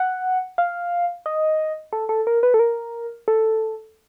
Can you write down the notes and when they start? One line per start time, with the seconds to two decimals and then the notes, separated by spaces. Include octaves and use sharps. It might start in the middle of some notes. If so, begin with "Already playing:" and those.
Already playing: F#5
0.58 F5
1.26 D#5
1.93 A4
2.09 A4
2.27 A#4
2.43 B4
2.54 A4
2.59 A#4
3.28 A4